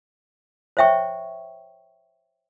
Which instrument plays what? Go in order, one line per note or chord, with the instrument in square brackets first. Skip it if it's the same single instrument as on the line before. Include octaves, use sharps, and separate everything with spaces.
[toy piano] C5 C#5 E5 G5 C#6